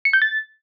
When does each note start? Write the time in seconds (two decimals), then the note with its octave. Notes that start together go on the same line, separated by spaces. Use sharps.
0.05 C#7
0.13 G6
0.22 A6